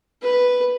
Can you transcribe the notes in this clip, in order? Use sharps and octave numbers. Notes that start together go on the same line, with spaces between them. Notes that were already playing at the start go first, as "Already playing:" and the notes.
B4